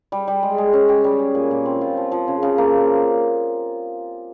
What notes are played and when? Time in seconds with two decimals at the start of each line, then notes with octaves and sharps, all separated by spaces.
0.12 G3
0.27 G3
0.43 G#3
0.58 G#3
0.73 C#4
0.89 G4
1.04 G3
1.19 G#4
1.35 A#2
1.51 A#2
1.66 C4
1.81 F4
1.97 F3
2.12 F3
2.28 C#3
2.43 C#3
2.58 A#3